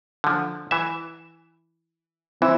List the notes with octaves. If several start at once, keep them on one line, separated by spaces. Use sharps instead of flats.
D3 F3
E3 E5
E3 C4 E4 E5